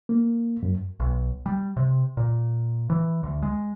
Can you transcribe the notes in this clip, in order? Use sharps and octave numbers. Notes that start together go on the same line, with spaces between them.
A#3
F#2
B1
G3
C3
A#2
E3
D2
G#3